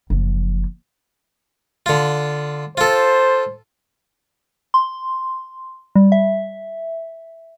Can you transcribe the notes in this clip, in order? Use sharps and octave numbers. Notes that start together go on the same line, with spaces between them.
F#1 F3
D3 F4
F4 A4 C5
C6
G3
E5